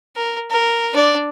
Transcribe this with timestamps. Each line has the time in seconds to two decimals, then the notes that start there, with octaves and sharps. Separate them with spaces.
0.16 A#4
0.51 A#4
0.94 D4 D5